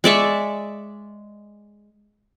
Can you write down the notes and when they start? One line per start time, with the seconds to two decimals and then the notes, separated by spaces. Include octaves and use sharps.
0.04 G#3 D5 E5 C#6